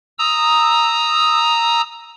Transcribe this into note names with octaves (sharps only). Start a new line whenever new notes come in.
A#5 D#6 E6